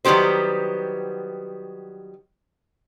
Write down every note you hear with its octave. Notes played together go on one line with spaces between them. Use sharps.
D#3 F#3 G3 B3 G4 C5